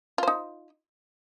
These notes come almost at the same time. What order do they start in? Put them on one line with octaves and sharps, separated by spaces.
F4 C5 D#4